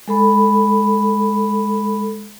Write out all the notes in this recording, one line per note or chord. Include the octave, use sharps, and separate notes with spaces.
G#3 A4 B5